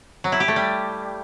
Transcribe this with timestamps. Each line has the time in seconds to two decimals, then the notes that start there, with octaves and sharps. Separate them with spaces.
0.24 F#3
0.32 E4
0.40 G4
0.48 A3
0.56 G3